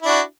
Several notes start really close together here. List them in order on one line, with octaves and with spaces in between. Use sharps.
E4 D4 F#4